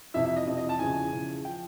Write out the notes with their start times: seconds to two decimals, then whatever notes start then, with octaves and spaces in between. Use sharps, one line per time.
0.14 F2 C3 E3 E5
0.25 E5
0.36 D#5
0.47 F2 C3 E3 D#5
0.58 D#5
0.69 A5
0.79 E2 C#3 F3 G#5
1.12 E2 C#3 F3
1.45 F3 G5